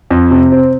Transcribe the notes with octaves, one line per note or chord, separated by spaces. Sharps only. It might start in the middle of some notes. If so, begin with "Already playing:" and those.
F2
C3
C4